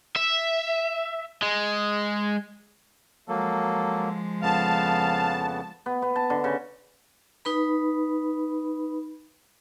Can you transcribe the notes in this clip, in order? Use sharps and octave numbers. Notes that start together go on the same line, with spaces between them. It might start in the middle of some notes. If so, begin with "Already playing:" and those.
E5
G#3
F3 F#3 G#3 A#3 A4
F2 C#3 B3 F5 A5
B3
B3
A5
D3
C#3
D#4 B4 B5